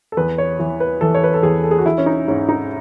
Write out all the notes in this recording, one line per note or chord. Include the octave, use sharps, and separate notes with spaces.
A4
E2 B4
C#5
E3
B4
E3 A4
C#5
B4
A4
E2 G#4
A4
G#4
F#4
E3 E4
C#4
D#4
G#2 C#4
D#4